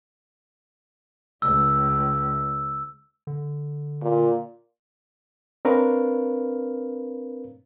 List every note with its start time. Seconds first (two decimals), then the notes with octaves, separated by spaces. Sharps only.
1.42 C#2 E6
3.27 D3
4.02 A#2
5.65 C4 D4 A#4 B4 C#5 F5